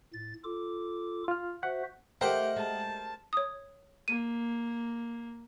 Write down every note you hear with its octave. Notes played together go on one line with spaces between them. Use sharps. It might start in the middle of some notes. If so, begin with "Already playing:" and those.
A2 A6
F4 A4 D6
F4 F6
F#4 C5 E5 F#5
A3 G4 A#4 C5 D#5 F#5 G5
G#3 A5
C#5 D#6
A#3 D#7